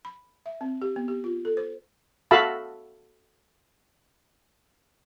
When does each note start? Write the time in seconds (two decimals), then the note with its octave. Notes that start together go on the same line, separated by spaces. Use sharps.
0.05 B5
0.46 E5
0.61 C4
0.82 G4
0.96 B3
1.08 G4
1.24 F4
1.45 A4
1.57 C5
2.31 F#4 A4 E5 F5 A5 B5